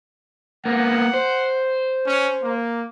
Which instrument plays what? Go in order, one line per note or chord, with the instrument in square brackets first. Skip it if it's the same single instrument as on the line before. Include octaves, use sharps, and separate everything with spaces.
[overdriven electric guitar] A#3 B3 [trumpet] F#5
[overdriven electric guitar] C5
[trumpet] C#4
A#3